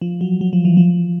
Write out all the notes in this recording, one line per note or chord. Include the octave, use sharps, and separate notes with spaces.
F3
F#3
F#3
F3
E3
F3